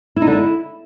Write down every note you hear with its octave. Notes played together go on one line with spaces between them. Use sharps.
E4
D#4
D3
E4